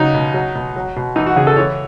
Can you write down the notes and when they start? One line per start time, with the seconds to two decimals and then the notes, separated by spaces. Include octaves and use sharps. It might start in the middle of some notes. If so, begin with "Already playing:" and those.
Already playing: C#3 F#3 D#4
0.14 B2
0.34 F#3
0.55 B2
0.76 F#3
0.96 B2
1.16 E3 D#4
1.27 F#4
1.36 C#3 G#4
1.47 A4
1.57 E3 C#5